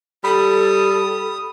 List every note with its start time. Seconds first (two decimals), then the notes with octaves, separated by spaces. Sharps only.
0.24 G3 A4 B5 D#6